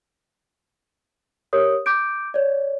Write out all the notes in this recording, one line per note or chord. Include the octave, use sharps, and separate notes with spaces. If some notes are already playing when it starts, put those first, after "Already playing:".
G4 A#4 C#5 D#6
D6 G6 D7
C#5 D5